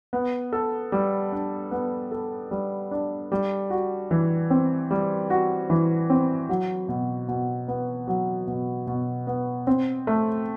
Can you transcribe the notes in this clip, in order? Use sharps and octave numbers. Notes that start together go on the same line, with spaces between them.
B3
A4
G3
D4
B3
A4
G3
D4
G3
F#4
E3
C4
G3
F#4
E3
C4
F#3
B2
B2
B3
F#3
B2
B2
B3
C4
A3